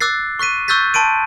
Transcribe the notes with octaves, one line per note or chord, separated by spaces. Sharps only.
D6 E6 F#6 A6 C7
C#6 F#6 B6 D#7
C#6 E6 F#6 G6 A6 B6
A5 C6 D7 D#7